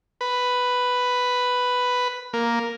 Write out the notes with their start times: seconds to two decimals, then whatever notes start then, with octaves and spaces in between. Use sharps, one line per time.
0.21 B4
2.33 A#3